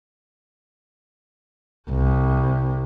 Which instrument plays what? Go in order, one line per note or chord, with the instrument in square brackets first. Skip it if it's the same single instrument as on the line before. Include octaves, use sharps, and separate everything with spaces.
[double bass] C2